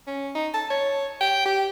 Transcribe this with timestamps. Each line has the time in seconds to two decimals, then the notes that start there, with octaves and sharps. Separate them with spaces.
0.07 C#4
0.35 D#4
0.54 A5
0.70 C#5
1.21 G5
1.46 G4